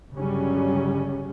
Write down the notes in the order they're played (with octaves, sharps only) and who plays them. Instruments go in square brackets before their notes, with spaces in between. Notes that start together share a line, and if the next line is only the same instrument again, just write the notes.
[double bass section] G1 C#3 F#3 G3 C#4